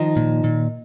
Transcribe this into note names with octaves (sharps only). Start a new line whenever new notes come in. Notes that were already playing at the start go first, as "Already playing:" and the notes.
Already playing: D#3 F3 D#4
A#2
A#2